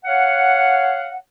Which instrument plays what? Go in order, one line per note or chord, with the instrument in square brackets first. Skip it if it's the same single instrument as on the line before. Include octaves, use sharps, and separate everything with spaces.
[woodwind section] C#5 F5 F#5